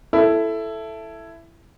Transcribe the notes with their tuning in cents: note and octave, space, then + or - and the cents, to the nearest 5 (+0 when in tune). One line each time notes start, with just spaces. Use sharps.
E4 +10 A4 +0